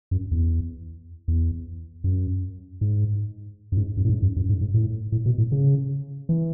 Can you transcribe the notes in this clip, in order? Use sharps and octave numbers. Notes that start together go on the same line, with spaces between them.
F#2
E2
E2
F#2
G#2
F#2
G#2
F#2
A2
G#2
F#2
F#2
G#2
G#2
A2
A2
B2
A2
C#3
E3